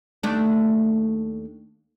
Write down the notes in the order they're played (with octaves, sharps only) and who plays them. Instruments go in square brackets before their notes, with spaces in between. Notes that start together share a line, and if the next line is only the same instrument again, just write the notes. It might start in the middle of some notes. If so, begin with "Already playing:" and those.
[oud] D#2 A3 D4